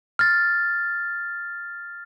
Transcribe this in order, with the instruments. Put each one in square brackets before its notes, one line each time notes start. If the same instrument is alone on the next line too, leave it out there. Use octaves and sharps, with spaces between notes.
[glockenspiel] F6 A6